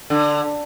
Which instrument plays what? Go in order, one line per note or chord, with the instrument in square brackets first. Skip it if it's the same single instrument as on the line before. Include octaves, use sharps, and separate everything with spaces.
[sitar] D3